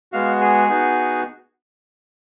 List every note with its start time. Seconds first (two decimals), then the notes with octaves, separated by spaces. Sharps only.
0.12 G#3 B3 F#4 F5
0.41 G#4
0.68 B3 D#4 F#4